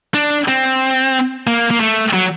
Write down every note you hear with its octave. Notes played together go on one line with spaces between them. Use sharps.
D4
C4
A#3
A#3
A3
F#3